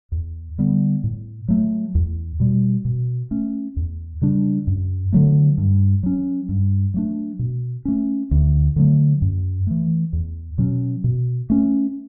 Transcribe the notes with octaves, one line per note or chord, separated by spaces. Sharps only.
E2
D3 G3 B3
A2
F#3 A3
E2
B2 G3
B2
A3 C#4
E2
C#3 G3 D4
F#2
D3 F#3 A3
G2
F#3 C#4
G2
F#3 A3 D4
B2
A3 C#4
D2
D3 F#3 A3
F#2
E3 A3
E2
B2 F#3 C#4
B2
A3 C#4